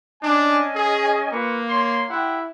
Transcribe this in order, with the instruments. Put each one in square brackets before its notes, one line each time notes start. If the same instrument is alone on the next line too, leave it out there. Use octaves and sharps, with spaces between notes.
[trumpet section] C#4 D#5 G#5 [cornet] D4
[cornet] G#4
[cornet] A#3 [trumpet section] F4 B4 C#6
[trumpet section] C#5 C6
[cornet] E4 [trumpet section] G4 F#5